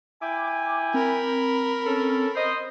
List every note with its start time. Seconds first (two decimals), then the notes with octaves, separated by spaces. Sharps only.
0.21 E4 G5 G#5 D6
0.94 C4 A#4 B5
1.86 C#4 A4
2.36 C5 D#5